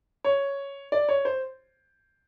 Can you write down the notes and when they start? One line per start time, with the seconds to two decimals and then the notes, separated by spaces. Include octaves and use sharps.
0.25 C#5
0.92 D5
1.09 C#5
1.25 C5